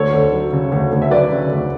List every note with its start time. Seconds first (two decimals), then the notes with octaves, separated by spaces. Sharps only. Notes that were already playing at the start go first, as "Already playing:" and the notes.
Already playing: D2 A4 C#5
0.13 D2
0.33 F#3
0.53 C#3
0.72 D2
0.92 D2
1.02 E5
1.10 F#3 B4 D5
1.31 C#3
1.51 D2